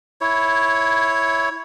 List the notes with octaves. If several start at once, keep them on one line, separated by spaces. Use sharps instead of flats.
E4 C#5